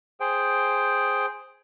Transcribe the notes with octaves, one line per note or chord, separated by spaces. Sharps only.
G#4 C5 G5